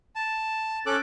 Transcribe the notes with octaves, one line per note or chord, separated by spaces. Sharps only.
A5
C#4 A4 D6 F#6